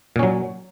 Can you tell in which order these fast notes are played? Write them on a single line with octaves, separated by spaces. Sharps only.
A#2 C#4 F#3